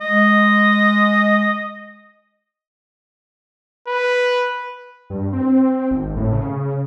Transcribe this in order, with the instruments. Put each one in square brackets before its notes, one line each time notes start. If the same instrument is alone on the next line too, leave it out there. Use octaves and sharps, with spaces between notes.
[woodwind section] G#3 [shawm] D#5
[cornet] B4
[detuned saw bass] G2
C4
G#1
A2
C#3